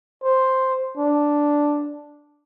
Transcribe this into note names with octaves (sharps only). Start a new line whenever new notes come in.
C5
D4